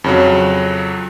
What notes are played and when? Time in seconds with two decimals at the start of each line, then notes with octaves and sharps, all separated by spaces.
0.04 F2 C#3 F#3